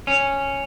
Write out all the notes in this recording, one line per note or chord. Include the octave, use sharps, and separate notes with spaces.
C#4